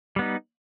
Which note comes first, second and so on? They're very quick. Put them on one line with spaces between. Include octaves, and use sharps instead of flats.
G3 B3 D#4